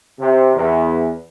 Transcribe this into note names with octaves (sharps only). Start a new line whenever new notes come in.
C3
E2